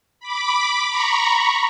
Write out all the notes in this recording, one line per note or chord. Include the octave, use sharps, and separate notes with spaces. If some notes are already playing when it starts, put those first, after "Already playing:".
B5 D6
A#5 B5 C#6